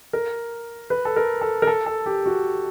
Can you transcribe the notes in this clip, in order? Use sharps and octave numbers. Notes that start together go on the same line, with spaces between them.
A#4
B4
A4
A#4
A4
A#4
A4
A4
G4
F#4